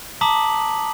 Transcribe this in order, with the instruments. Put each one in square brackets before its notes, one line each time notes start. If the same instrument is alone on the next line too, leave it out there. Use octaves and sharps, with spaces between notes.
[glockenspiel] A5 A#5 D6 D#6 B6 F#7